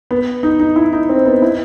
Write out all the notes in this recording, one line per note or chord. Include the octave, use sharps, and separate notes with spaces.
B3
D#4
D#4
E4
D#4
C4
B3
E4